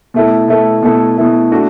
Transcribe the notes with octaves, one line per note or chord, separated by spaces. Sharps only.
B2 A3 E4 A4
B2 A3 E4 A4
B2 A3 E4 A4
B2 A3 E4 A4
A3 D4 F#4